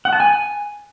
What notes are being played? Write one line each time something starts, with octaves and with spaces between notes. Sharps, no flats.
F#5
A5
G#5